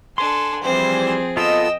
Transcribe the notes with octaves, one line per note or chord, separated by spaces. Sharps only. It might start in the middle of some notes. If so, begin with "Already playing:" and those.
D4 A4 G#5 C6
E3 F3 G3 C4 G#4 C5
B3 F4 A4 D#5 G5 E6